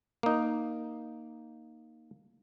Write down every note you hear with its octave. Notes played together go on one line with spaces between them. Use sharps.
A#3 D#4